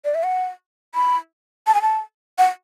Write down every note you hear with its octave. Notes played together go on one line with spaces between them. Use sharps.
D5
E5
F#5
B5
A5
G#5
A5
F#5